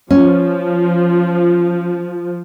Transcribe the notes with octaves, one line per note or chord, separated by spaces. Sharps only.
F3 C#4